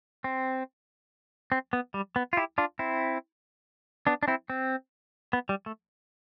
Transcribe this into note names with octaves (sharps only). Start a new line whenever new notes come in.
C4
C4
B3
G3
B3
F4
E4 G4
D4 F4
C4 E4
B3 D4
D4
C4 E4
C4
B3
G3
A3